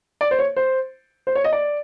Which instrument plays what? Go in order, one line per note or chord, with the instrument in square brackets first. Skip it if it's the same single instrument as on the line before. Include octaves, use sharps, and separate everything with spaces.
[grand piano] D5
C5
C#5
C5
C5
C#5
D#5
D5